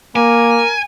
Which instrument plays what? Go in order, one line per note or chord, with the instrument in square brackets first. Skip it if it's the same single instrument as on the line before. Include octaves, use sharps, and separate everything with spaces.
[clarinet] A#3 [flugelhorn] A#4 [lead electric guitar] G#5